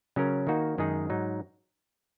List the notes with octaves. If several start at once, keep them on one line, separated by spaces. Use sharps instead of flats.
C#3 F#3 C#4 A#4
D#3 A#3 D#4 F#4
F#2 D#3 G#3 D#4 G#4
G#2 F#3 D#4